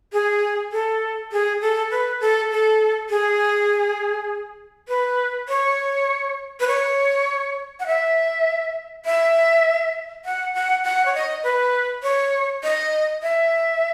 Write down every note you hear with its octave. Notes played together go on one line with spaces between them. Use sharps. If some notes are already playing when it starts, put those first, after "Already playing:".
G#4
A4
G#4
A4
B4
A4
A4
G#4
B4
C#5
B4
C#5
F#5
E5
E5
F#5
F#5
F#5
C#5
D#5
B4
C#5
D#5
E5